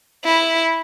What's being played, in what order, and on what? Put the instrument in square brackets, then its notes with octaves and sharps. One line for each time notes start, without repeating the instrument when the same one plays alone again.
[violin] E4